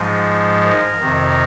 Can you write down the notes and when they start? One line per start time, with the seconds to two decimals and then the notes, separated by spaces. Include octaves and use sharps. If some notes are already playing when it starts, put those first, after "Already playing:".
Already playing: G#2 F3 G#3
0.64 A#4
1.01 F2 C3 D#3